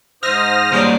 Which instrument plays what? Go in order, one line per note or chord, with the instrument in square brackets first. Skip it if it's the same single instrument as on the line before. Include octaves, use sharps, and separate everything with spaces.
[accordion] G#2 C5 D#6 [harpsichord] E5 [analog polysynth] F6 A#6
[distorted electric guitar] G3 A#3 [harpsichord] G#3 C#4 D4